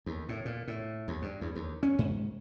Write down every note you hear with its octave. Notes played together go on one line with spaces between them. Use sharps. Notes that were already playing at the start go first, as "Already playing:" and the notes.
D#2
A2
A#2
A2
D#2
G2
E2
D#2
C#4
G#2